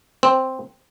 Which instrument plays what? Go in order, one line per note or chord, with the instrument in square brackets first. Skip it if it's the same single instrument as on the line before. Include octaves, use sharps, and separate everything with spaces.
[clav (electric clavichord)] C4